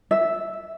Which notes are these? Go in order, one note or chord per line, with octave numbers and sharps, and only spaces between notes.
E5